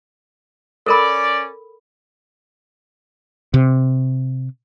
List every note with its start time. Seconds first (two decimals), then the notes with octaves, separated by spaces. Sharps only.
0.86 C#4 A4 A#4 D5 B5
3.54 C3